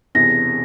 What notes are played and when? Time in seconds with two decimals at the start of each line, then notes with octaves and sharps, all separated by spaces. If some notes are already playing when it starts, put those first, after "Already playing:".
0.15 E1 E2 C3 E3 A#6